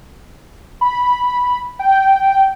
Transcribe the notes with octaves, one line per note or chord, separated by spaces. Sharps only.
B5
G5